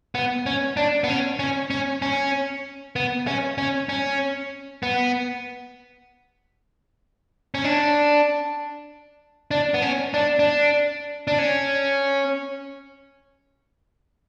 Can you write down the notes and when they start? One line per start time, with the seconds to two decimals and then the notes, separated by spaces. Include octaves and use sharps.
0.15 B3
0.46 C#4
0.77 D4
1.04 B3
1.09 C#4
1.39 C#4
1.70 C#4
2.02 C#4
2.96 B3
3.27 C#4
3.58 C#4
3.89 C#4
4.83 B3
7.54 C#4
7.64 D4
9.51 D4
9.74 B3
9.82 C#4
10.14 D4
10.39 D4
11.28 D4
11.39 C#4